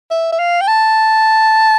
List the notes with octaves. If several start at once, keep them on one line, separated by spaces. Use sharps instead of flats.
E5
E5
F5
G5
A5